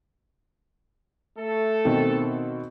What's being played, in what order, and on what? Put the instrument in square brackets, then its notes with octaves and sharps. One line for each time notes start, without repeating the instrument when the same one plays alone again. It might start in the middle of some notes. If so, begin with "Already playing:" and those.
[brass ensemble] A3 A4
[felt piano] B2 D#3 C4